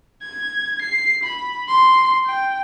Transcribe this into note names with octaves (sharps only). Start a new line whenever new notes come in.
G#6
C7
B5
C6
G5